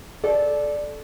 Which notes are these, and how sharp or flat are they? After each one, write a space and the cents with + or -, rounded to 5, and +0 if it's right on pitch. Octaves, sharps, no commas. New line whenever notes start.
A4 -25 D5 +0